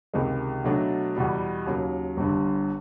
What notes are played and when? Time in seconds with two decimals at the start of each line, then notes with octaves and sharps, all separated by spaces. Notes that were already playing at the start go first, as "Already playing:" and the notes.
0.14 C#2 C3 D#3 G#3
0.64 B2 F#3 A3 D4
1.16 E2 B2 G3
1.66 D#2 C#3 F#3
2.17 G1 G2 D3